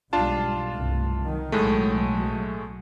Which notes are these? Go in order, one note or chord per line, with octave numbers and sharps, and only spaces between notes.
B1 G#2 G3 D4 F4 A5
C2 G2 A3
D#3 F#3
B1 A2 F#3 G#3 A3